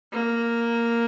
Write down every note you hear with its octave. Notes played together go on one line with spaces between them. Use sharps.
A#3